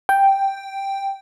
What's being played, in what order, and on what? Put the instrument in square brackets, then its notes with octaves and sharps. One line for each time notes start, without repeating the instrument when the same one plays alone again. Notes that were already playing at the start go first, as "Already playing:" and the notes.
[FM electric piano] G5